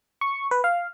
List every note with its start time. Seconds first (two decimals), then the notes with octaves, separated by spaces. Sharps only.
0.21 C#6
0.51 B4
0.64 F5